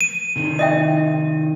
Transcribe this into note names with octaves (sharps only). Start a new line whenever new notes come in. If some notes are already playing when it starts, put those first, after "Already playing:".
D#7
C3 D#3
D#5 E5 G5